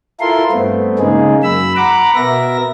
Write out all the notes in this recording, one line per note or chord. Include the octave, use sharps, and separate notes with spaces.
E4 F4 A4 A#4 C6
G2 A3 B3 C4
C#3 G#3 A#3 D#4 G#4
F#2 B5 E6
F#5 A#5 B5 D6
B2 B3 A#4 E5 A#6